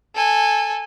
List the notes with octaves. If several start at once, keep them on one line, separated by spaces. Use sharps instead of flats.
A4 G#5